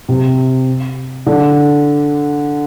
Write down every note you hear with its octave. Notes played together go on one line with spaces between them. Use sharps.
C3
D3